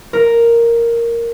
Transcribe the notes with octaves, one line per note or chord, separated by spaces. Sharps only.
A#4